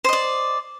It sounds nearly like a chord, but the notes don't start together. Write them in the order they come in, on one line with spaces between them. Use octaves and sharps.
C5 D#5 D5